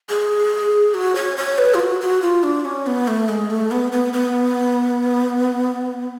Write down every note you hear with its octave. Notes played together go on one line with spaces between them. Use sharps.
G#4
F#4
C#5
C#5
B4
F4
F#4
F#4
F4
D4
C#4
B3
A3
G#3
A3
B3
B3
B3